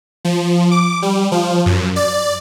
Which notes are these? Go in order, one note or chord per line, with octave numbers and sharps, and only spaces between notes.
F3
D6
G3
F3
F#2
D5